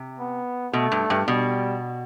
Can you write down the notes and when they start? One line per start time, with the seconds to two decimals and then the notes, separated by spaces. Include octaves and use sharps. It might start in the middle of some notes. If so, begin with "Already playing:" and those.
Already playing: C3
0.19 B3
0.73 B2 A3
0.92 G2
1.10 G2
1.28 B2 G3